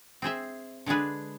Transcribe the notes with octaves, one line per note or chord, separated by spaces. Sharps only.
C4 G#4 C5 E5
D3 G#3 D4 G#4 B4